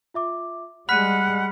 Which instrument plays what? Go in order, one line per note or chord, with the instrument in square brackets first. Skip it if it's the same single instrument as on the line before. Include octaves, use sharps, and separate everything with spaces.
[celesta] F4 E5 D6
[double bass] G3 G#3 [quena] F#5 [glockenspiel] B5 F6 B6 [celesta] F#6 D#7